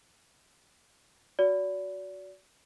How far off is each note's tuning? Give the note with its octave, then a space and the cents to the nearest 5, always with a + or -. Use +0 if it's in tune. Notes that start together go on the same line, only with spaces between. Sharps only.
F#4 +0 D5 -35